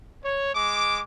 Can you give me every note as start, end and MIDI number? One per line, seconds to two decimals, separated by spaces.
0.23 0.50 73
0.54 1.00 56
0.54 1.00 86